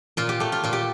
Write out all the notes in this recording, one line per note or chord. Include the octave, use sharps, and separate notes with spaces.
A#2 F4
G4
A3 G4
F4
A#2 F4
G4